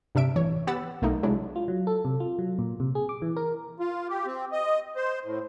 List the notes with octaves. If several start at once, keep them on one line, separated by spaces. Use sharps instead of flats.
G2 C3 D4 E5 D7
A1 E3 C#5
B3 G4 F#5 B5 E6 A6
B1 A3 A#3 D#4
C3 F#3 G#3 D4 E4
F4
F#3
A4
C3
F4
F#3
A#2
C3
G#4
D6
E3
A#4
F4
G4
C4
D#5
C5
A2